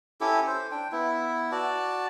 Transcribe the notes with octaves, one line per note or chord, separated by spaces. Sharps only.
C#4 E4 G4 A4
C5
D4 G5
B3 E4
F#4 D5 A5